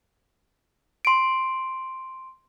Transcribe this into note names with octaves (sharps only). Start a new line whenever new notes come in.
C6 D7